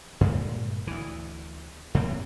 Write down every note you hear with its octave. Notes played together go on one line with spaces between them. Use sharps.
G2 A#2 D3 G#3
D2 E3
F2 A2 A#3 C4